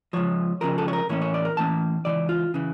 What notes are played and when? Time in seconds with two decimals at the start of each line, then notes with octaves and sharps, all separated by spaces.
0.13 C#2 C#3 F3 C#5
0.61 C#2 C#3 F3 A#4
0.78 A4
0.88 C#5
0.93 A#4
1.09 A2 E3 A#3 C#4 C#5
1.22 C#5
1.34 D5
1.45 A#4
1.57 A2 E3 A#3 C#4 A5
2.05 C#3 E3 D5
2.09 C#2
2.29 F4
2.54 C#3 E3